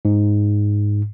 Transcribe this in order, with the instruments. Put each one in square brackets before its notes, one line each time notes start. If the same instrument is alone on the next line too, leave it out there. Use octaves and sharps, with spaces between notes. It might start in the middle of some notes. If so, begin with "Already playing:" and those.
[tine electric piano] G#2